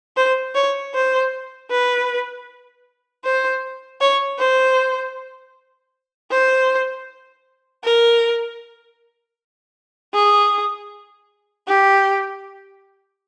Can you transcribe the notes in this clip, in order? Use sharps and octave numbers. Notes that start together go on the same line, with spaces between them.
C5
C#5
C5
B4
C5
C#5
C5
C5
A#4
G#4
G4